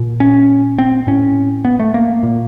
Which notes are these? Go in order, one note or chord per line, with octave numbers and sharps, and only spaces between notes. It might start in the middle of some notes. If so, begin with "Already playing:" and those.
Already playing: A#2
C#4
C4
A2 C#4
B3
A3
A#3
A#2